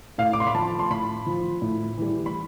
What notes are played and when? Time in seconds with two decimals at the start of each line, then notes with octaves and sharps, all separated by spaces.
0.18 A2 F5
0.33 D6
0.40 C6
0.47 B5
0.54 F3 A5
0.79 C6
0.90 A2 B5
1.26 F3
1.62 A2
1.98 E3 G3
2.26 B5